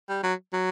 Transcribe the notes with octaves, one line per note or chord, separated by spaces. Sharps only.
G3
F#3
F#3